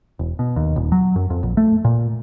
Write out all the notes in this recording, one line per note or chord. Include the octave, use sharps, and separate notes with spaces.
E1
B2
D#2
D#1
F#3
F#2
F2
A#1
A3
A#2